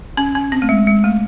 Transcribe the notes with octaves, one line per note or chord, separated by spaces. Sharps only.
C#4
C#4
C4
A3
G#3
G#3
A3